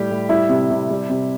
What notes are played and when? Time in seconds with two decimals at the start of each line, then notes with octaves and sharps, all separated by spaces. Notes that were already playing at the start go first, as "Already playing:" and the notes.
Already playing: A2 G3 G4
0.10 A2
0.29 G3 E4
0.49 C3
0.71 C3
0.90 G3
1.10 C3